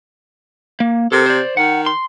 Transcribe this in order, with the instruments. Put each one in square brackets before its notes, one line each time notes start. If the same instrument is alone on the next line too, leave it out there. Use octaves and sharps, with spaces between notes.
[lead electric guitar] A#3
[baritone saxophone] C3 [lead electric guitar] A4 A#4
[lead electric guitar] C5 D5
[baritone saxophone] D#3 [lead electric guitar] F#5
[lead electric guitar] C6